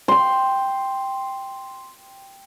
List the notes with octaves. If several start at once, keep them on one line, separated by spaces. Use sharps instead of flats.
G5 C6